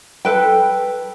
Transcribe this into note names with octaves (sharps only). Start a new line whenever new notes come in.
A4 B4 G5